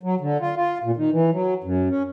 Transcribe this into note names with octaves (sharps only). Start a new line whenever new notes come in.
F#3
D3
F4
F4
A#2
D#3
E3
F#3
F#2
C#4